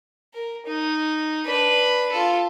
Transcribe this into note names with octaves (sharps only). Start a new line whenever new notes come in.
A#4
D#4
D4 B4
F4 A4